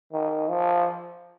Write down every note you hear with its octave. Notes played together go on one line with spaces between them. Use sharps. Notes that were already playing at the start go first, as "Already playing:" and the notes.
D#3
F3